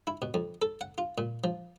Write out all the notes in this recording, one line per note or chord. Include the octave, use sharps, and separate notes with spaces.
E4
B2
F2
A4
F#5
F4
A#2
F3